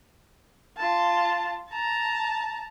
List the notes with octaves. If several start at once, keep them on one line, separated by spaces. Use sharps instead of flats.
F4 A5
A5 A#5